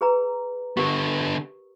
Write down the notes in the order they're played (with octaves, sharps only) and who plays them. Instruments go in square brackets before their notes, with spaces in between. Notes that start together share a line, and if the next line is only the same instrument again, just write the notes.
[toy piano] G#4 B4 A#5
[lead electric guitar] D3 B3 [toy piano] G4 A#4